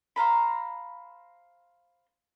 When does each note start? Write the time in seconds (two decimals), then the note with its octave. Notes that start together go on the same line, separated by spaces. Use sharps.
0.16 C5 F5 A#5 B5